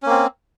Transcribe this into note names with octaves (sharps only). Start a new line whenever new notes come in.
A#3 C4 C#4